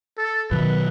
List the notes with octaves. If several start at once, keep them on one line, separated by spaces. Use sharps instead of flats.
A4
B2 D#3 F#3 B4